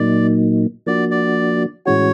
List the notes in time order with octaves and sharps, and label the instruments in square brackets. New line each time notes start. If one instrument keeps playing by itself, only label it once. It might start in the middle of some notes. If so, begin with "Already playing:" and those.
Already playing: [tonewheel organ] A#2 F#3 A#3 D#4 [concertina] D5
[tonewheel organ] F3 A#3 D4 F#4 [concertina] D5
[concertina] D5
[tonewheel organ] A2 E3 G#3 C#4 F#4 [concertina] C#5